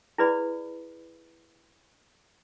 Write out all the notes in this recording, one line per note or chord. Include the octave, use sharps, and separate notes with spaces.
E4 G#4 B4 D5 B5